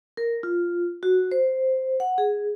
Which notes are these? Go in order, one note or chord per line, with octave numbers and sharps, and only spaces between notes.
A#4
F4
F#4
C5
F#5
G#4